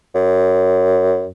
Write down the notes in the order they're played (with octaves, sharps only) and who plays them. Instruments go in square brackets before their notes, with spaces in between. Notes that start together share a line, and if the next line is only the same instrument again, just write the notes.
[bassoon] F#2